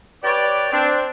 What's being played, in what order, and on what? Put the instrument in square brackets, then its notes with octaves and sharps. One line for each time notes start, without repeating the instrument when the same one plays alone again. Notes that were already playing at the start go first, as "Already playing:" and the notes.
[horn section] G4 B4 C#5 D5
C4 D4